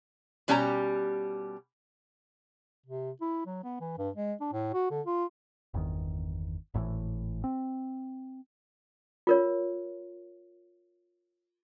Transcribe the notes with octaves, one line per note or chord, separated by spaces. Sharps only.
B2 G3 C#4 G4 G#5 A#5
C3
E4
F#3
B3
E3
G2
G#3
D4
A2
F#4
D3
F4
G1 E2 D#3
G#1 A2 C3 E3
C4
F4 A#4 C#5